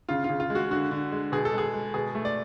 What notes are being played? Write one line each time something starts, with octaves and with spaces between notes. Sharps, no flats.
C#3 F4
F4
C#3
F4
G#3
F#4
D3 F#4
D3
G#3
B2 G#4
A4
G#3 G#4
G#3
B2 G#4
A3
D5